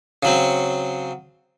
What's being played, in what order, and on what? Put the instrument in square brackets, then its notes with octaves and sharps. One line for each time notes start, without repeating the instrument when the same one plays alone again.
[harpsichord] C#3 F#3 C4